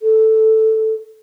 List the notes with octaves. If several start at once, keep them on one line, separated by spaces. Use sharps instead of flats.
A4